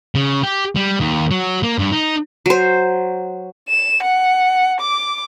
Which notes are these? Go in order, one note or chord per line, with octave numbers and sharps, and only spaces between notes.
C#3
G4
G3
D#2
F#3
A#3
G2
D#4
F#3 C5
E7
F#5
D6